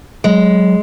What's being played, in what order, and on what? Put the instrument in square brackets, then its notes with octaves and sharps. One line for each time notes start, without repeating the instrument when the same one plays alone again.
[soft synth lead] F#3 [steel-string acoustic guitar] G#3